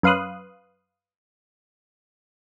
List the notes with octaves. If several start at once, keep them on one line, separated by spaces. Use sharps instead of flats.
F#2 B4 F5 C6 D#6 F#6